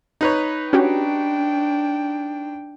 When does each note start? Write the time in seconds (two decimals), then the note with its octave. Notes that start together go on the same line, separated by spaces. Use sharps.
0.21 D#4 B4 C#5
0.73 C#4 D4 F#4 G4 G5